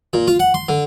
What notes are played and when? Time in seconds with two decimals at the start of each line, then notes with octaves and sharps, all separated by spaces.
0.13 A#2
0.28 F4
0.40 F#5
0.54 C6
0.69 D3